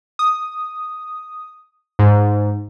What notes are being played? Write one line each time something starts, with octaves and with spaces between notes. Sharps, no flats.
D#6
G#2